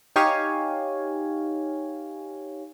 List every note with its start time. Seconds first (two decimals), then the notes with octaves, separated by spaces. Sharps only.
0.16 D#4 G4 C#5 F5 G#5